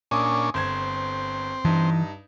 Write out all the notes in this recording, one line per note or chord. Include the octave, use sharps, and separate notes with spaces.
A#2 C#4 D4 G#5 D6 D#6
G1 C4 C5 G#6
G2 E3 D#4